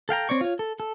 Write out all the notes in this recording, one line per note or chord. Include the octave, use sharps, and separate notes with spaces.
A4 F5 G5 A#5
C4 C#5 D5 C#6
F4 C#5
A4
A4